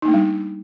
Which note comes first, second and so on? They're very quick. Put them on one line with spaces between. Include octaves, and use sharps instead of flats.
D#4 A#3 A3 D4 G3